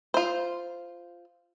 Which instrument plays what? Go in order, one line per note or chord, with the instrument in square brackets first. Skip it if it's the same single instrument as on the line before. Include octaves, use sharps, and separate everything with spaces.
[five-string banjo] F4 C5